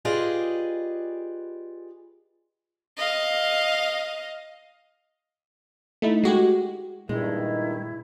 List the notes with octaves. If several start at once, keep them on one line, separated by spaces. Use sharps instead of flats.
F4 G4 G#4 B4 D5 D#5
D#5 F5
A3 D#4 E4
G#3 F#4 G4
G2 A#2 D#3 G#3 E4